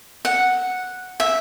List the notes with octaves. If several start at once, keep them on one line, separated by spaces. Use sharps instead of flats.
F#5
E5